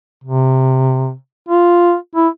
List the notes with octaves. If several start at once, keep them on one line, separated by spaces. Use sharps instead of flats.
C3
F4
E4